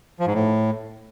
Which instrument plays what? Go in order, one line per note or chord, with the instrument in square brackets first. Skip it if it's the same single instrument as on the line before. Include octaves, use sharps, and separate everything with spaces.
[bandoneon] F3
G#2
A2